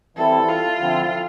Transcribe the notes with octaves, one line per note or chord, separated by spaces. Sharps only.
E3 G3 C4 E4 A4
F4
D3 F3 C4 E4